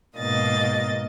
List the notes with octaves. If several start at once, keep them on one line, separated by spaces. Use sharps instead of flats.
G#2 B2 A#3 D#5 A6